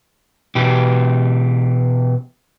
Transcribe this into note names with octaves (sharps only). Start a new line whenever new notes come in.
B2 E3 G4